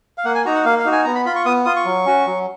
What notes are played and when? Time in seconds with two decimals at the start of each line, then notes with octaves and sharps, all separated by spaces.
0.18 F5
0.25 A#3 F#5
0.35 G#5
0.45 D#4 F#4 A#5
0.55 F#5
0.65 A#3 F5
0.79 F5
0.85 D#4 F#4
0.92 G#5
1.05 B3 A#5
1.15 B5
1.26 F4 B5
1.36 C#6
1.46 B3 D#6
1.65 F4 D#6
1.76 C#6
1.85 F#3
2.06 C#4 F#4
2.26 F#3